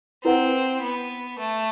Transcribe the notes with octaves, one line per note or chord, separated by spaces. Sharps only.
C4 E4 B4 F#5
B3
A3